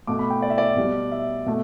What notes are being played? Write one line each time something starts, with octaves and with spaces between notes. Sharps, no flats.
B2 A3 D6
B5
G5
D5
E5
D5
B2 G3
E5
B2 A3